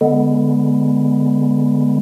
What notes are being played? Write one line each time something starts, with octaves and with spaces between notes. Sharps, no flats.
D3 G#3 B3